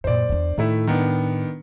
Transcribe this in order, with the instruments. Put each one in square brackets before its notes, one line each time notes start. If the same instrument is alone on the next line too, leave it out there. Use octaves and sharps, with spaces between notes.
[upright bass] F#2 A#2 [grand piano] C5 D5
[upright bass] E2 D4
[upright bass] A2 [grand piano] D#3 A3 E4
[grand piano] D#3 B3 D4